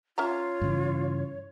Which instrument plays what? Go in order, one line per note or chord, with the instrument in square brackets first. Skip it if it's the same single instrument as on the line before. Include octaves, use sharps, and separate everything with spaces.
[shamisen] C#4 E5 A#5 [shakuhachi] F4 [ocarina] C#5
[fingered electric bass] G2 C#3 E3